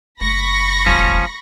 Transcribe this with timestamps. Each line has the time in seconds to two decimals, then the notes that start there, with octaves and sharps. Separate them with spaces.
0.21 F#1 A3 B5 C#6 A#6
0.86 D#1 D2 F3 C#4